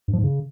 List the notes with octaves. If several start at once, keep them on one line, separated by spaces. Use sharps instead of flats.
G2
F3
G#2
C#3